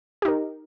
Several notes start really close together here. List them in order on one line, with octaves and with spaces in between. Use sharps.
G4 D#4 A#4